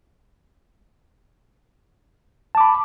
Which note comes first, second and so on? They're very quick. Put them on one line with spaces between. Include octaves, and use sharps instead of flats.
A5 D6 B5